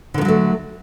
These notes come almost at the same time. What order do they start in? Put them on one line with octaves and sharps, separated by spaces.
D3 D#3 F3 F#3 A3